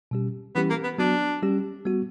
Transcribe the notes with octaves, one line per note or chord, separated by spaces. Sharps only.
B2 G3 C#4 G4
E3 G3 B3 C#4 E4 G4
A#3
B3
F#3 B3 D4 F#4
G3 C#4 G4
G3 B3 F#4